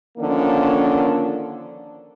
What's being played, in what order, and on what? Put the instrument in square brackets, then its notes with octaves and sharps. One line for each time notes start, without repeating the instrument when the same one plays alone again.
[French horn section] D3 D#3 F3 A#3 C#4